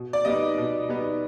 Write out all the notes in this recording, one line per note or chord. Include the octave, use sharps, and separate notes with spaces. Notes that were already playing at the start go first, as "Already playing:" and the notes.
Already playing: B2
D5
G3 B3 D#4 D#5
B2
G3 B3 D#4